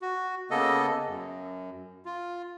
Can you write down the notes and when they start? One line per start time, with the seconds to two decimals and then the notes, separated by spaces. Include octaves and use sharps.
0.02 F#4
0.51 C#3 A#3 B3 A4 D#5
1.07 F#2
2.05 F4